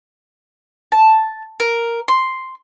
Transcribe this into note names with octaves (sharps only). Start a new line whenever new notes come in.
A5
A#4
C6